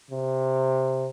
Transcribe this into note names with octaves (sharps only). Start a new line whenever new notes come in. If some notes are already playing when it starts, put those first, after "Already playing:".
C3